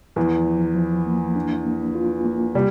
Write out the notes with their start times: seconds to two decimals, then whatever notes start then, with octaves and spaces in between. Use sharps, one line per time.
0.16 E2 E3 F3
0.47 F3
0.76 F3
1.07 A#3
1.36 D4
1.66 A#3
1.95 F4
2.25 A#3
2.55 C3 G3